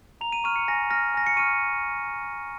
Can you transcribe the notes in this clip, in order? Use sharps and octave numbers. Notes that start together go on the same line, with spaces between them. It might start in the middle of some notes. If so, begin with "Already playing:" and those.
A#5 F7
D#7
C#6 F6 D#7
C#7
G#5 A#6
F6 A#6
G#5 A#6
C#7
C#6 F6 D#7